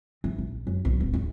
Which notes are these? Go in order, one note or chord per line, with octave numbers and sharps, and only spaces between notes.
E3
A#1
F#2
B1
D1
E2